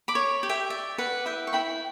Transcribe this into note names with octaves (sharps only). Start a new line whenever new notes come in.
B5 D6
C#5
G4
E5 G5
D5 E5
B4 F#5
E4 E5 G5
C#6
E4 G5 B5